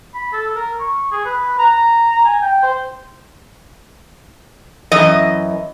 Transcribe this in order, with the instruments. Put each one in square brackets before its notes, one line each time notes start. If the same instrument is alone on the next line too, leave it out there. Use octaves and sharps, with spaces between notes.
[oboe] B5
A4
A#4
C#6
G#4
B4
A#5
G#5
G5
C5
[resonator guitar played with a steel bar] F#2 E3 D#5